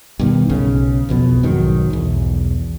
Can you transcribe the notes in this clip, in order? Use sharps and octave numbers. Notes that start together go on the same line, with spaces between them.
G2 B2 D#3
B1 C#3
B1 F2 B2
B1 G#2 D#3 F#3
B1 E2